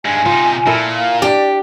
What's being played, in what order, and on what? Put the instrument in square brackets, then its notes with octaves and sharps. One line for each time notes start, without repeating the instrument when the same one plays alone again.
[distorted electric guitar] G2 G#3 [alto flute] G#5
[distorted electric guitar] C3 D#4 [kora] F4
[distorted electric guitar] A#2 [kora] E4 A4 A#4
[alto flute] F5
[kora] D4 [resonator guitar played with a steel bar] G4 [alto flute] D5